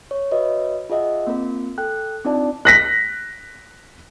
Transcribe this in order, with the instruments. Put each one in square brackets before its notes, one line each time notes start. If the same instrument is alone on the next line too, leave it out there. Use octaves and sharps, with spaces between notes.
[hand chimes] C#5
F#4 B4 C#5 D#5 E5
F4 G#4 D#5 E5 F#5
A#3 C4 F4 A#4
A4 G5 F#6
C4 D4 D#4 F4 D5 A5
[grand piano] F#6 A#6 B6